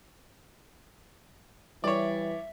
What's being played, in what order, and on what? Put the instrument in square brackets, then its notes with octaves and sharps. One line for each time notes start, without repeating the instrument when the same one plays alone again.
[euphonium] E3 [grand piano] G3 [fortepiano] C#5 D5 [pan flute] E5